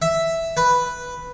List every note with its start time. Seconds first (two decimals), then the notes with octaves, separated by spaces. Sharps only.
0.02 E5
0.57 B4